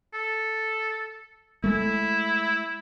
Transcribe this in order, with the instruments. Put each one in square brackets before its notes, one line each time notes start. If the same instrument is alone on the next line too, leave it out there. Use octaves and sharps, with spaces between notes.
[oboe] A4
[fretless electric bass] G#3 A3 [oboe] E4